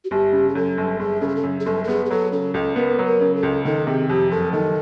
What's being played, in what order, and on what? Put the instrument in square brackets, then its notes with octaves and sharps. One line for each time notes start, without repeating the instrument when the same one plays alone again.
[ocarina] F#4
[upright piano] G1 [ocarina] G4
[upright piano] C#3
[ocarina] G#4
[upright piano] F#2 [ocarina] A4
[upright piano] G1
[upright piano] G1 [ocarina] G#4
[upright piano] C#3 [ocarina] A4
[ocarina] G#4
A4
[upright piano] F#2
[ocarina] G#4
[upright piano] G1 [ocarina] A4
[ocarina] A4
[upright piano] B3 [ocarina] G#4
[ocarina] G#4
[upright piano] F#3 [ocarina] A4
[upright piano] C#3 [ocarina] A4
[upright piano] C#2 [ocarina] A4
[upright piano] B3 [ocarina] A#4
[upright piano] F#3
[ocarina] A#4
[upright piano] C#3
[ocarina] A4
[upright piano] C#2
[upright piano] D#3 [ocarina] A4
[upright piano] C3 [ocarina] G#4
[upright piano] F2 [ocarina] G4
[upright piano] F#1 [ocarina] A4
[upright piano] D#3 [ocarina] A4